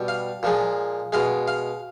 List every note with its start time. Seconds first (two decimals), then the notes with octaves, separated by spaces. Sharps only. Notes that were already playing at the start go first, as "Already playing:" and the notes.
Already playing: B2 G3
0.08 F5
0.43 A#2 F3 G#3
1.13 B2 G#3 F5
1.48 F5